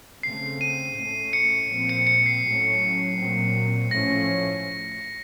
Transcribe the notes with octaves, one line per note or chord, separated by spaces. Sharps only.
C#3 A3 C4 C7
D#7
A2 A3 C#4
C#7
A#2 F3 C4
C#7
C#7
C7
A2 F#3 A3 C#4
A#2 F#3 C4
A2 F3 A3 C#4 A#6